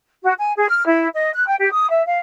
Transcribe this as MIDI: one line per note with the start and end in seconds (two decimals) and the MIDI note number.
0.23 0.33 66
0.38 0.53 80
0.57 0.70 68
0.70 0.85 89
0.87 1.08 64
1.14 1.30 75
1.33 1.46 90
1.47 1.55 79
1.60 1.72 67
1.72 1.89 87
1.90 2.04 76
2.06 2.20 77